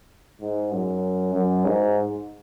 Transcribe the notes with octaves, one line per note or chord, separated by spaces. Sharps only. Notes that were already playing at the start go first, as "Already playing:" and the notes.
G#2
F#2
F#2
G#2